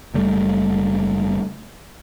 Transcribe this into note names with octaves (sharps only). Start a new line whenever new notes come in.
F#1 G3 A3